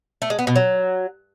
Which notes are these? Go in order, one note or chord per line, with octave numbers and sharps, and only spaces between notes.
A3
G#3
B3
B2
F#3